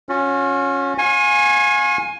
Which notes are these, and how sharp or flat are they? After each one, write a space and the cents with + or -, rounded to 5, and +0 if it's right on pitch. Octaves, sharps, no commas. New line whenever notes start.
C#4 +0 F#4 -45
F5 +35 G#5 +0 C#6 -40